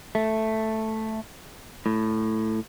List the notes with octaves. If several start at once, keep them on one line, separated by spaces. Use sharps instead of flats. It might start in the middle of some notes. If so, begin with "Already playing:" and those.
A3
A2